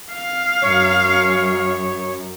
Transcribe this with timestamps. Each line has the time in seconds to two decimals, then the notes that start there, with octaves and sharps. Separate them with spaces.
0.12 F5
0.62 F#2 C#5